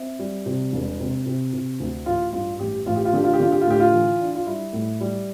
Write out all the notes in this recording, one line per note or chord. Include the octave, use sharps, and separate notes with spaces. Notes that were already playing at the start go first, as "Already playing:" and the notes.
Already playing: C4 E5
G3
C3
E1
C3
C3
C3
D2
A1 F4
G2 F4
A1 G4
A1 F4
G4
F4
D3 G4
F4
G4
D3 F4
G4
F4
A2 G4
F4
E3
D4
F4
G3 E4
A2
G3